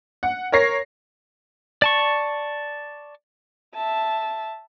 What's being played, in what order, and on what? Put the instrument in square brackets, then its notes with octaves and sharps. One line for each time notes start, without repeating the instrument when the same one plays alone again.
[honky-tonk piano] F#5
A#4 C#5 A#6 C7
[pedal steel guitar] D5 A5 C#6
[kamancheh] E5 A5